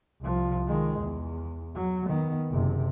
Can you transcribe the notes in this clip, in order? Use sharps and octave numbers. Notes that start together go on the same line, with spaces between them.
C2 F3
D#3 G#3
E2
F#3
D#3 B3
F#1 C3